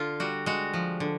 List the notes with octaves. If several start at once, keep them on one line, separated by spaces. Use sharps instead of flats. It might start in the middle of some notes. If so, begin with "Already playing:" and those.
Already playing: D3 F4
G3 F#4
G#3 F#4
F3
D3